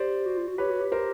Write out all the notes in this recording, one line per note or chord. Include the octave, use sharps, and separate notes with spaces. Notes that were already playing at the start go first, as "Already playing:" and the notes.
Already playing: G4 C5 D5
F#4
F4
F#4
G4 B4 C#5
F#4
G4
A#4 C5